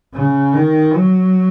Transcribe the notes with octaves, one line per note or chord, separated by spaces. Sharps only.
C#3
D#3
F#3